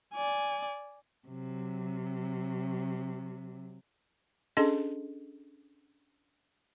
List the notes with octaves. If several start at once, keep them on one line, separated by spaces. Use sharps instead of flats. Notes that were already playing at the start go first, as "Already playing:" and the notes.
D5 G#5
C3 F#3
C#4 D4 G#4 A4 D#5 C6